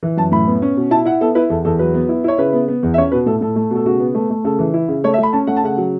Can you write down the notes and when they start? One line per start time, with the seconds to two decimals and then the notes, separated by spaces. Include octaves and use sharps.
0.03 E3
0.17 F#2 A5
0.32 A2 B5
0.48 B3
0.62 C#4
0.77 B2
0.91 E4 A5
1.05 E4 F#5
1.21 B3 A4
1.35 E4 B4
1.50 E2 A4
1.65 E2 A4
1.79 F#3 B4
1.94 B3
2.09 E4
2.24 E4 C#5
2.38 C#3 B4
2.53 B3
2.68 B3
2.83 E2
2.94 E5
2.98 C#4 C#5
3.12 B2 B4
3.26 A2 A4
3.41 A2 A4
3.56 A3
3.71 B2 A4
3.86 C#3 F#4
4.00 B3
4.15 A3
4.30 A3
4.44 C#3 A4
4.59 E3
4.74 E4
4.88 C#3
5.04 A3 C#5
5.14 E5
5.18 A3 B5
5.33 C#4 A5
5.47 A3 F#5
5.57 A5
5.63 C#3 F#5
5.77 F#3